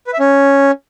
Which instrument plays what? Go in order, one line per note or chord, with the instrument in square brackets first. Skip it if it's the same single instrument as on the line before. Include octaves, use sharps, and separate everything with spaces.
[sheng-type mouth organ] B4
E5
C#4